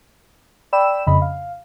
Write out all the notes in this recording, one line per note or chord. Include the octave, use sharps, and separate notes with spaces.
D5 G5 B5 E6 E7
F2 C#3 D#5 B5
F5